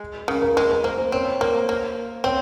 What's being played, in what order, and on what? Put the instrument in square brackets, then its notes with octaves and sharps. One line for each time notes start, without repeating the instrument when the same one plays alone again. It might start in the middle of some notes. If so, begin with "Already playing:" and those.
Already playing: [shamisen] G#3
[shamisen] C#3 [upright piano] A#4
[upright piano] A#4
[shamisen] G#3 [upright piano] A#4
[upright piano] A#4
[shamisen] A#3 [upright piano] C5
[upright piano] C5
[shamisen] C4 [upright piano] C#5
[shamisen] A#3 [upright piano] C5
[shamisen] A#3
[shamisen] C4 [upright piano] C#5